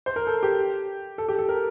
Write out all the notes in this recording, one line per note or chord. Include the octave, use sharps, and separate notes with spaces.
C5
A#4
A4
G4
A4
G4
A4
A#4